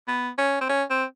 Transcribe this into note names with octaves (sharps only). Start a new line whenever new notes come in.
B3
C#4
C4
C#4
C4